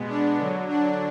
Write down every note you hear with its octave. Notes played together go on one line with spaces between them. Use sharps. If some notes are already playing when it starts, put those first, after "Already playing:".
Already playing: B2 G#3 B3
D4
D3 F#3
D4